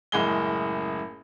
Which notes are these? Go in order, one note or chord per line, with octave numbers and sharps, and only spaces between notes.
F#1 A2 G#3 G7